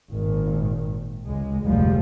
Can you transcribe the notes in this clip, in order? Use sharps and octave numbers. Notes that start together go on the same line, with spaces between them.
G#1 A#2 D#3
C#2 G#3
F1 D2 A2 F3 G3 G#3